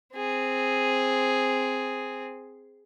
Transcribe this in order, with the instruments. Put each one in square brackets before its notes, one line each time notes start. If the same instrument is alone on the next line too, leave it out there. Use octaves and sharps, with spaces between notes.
[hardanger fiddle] C4 G#4